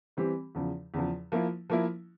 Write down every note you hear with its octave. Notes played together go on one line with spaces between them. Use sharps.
E3 G3 C4 G4
E2 C#3 F3
E2 C#3 F3
F3 A#3 E4
F3 A#3 E4